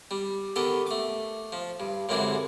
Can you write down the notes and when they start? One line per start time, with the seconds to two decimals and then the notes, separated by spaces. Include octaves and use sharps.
0.11 G3
0.56 D#3 B3 G4 A4
0.87 A3 D6
1.52 F3
1.80 G2
2.09 C#2 F#2 D3 E3 G#3 C4